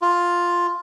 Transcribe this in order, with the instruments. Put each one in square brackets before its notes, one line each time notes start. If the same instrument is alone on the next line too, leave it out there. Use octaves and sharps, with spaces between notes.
[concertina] F4